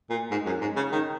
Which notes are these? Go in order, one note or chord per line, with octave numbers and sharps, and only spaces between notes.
A#2
G#2
F#2
G#2
C#3
D#3